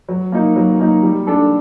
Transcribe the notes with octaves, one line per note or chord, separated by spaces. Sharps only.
F#3
A#3 D#4
F#3
A#3 D#4
G3
D4 A4